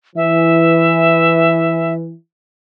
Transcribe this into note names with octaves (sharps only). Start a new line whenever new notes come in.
E3 E5